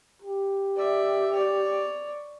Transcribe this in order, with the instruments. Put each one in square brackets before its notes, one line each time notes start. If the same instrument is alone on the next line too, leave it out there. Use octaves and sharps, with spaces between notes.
[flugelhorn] G4
[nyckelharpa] D5 E5
C#5 D5